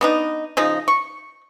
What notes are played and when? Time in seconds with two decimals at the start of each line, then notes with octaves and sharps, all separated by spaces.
0.01 B3 D4 D#4
0.57 C#3 F3 D#4
0.88 C#6